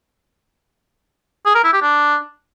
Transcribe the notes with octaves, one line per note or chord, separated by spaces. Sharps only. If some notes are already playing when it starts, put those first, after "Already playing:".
G#4
A#4
E4
G4
D4